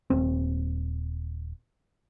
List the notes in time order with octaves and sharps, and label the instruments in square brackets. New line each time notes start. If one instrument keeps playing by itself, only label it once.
[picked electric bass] D#1 C4